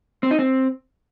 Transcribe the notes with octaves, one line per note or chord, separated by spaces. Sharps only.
C4
D#4
C4